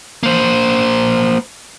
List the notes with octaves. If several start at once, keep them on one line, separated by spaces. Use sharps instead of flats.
A#3 C5